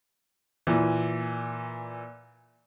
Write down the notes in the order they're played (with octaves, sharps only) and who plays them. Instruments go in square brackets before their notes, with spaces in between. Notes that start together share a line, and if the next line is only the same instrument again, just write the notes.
[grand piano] A#2 E3